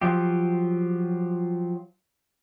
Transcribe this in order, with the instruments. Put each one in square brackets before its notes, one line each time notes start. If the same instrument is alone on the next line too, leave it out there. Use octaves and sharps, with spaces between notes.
[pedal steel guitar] F3 F#3 F4 G4